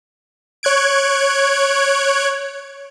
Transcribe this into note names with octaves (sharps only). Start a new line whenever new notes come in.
C#5 F#6 G#6 D7